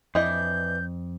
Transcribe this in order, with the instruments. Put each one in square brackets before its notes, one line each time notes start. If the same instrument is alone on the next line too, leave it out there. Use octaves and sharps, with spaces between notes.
[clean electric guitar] F2 [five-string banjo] E3 D4 D#5 [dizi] G6